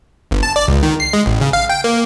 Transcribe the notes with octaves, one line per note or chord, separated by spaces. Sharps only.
G1
A5
D5
C#2
D#3
C7
G#3
A1
C#3
F5
G5
A#3